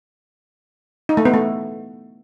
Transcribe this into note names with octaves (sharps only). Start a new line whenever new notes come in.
D#4
A3
B3
A3